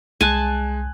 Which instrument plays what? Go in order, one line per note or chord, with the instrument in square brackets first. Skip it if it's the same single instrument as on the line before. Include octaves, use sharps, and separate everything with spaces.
[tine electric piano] C2 [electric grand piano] G#3 F#6 [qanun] G#5 A5